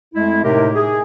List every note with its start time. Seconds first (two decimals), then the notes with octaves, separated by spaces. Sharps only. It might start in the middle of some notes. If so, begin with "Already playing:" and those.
0.14 F2 G#3 A3 E4
0.43 A2 C3 D#4 G4 A#4
0.75 G#4